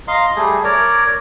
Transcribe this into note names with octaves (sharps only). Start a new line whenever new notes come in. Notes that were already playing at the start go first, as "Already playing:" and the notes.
D#5 F5 A#5 C6
G3 A3 G#4
A#4 C#5 D5